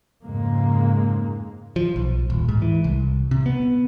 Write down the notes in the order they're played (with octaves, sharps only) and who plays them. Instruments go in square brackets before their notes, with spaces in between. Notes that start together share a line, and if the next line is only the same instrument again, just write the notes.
[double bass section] F2 G#2 C#3 G#3 A#3
[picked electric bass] F3
B1
D#1
G#2
E3
C2
C3
B3